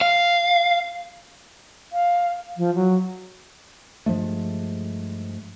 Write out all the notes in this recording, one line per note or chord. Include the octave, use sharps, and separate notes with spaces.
F5
F5
F3
F#3
G2 F3 G#3 A3